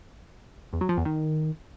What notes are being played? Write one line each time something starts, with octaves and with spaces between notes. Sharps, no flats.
E2
F#3
F3
E2
D#3